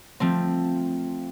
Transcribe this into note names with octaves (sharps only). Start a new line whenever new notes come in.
F3 A3 C4